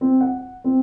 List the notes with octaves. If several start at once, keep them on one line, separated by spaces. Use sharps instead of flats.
C4
F#5
C4